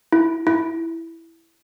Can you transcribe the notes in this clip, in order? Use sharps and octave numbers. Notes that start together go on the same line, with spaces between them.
E4
E4